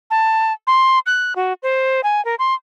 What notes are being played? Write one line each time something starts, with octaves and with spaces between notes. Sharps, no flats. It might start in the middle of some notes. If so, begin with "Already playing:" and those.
A5
C6
F#6
F#4
C5
G#5
A#4
C6